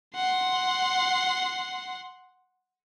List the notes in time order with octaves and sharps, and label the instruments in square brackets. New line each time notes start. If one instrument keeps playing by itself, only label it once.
[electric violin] F#5 C6